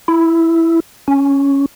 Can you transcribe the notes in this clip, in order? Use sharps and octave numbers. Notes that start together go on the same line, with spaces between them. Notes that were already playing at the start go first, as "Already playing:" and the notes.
E4
C#4